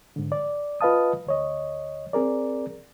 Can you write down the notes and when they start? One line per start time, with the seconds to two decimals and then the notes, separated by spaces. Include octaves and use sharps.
0.16 G#2 D3
0.32 D5
0.81 F4 B4 D#5 F5 A5 D#6
1.27 D2 C#5 D#5
2.13 C4 G#4 A#4 D5